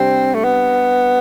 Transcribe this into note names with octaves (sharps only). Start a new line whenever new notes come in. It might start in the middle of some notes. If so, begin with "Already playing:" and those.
Already playing: C3 G3 C4 D4
A3
B3